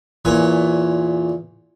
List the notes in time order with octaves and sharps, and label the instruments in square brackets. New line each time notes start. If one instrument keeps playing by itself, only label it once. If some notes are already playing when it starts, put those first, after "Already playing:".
[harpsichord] E2 A#2 C#5 G#5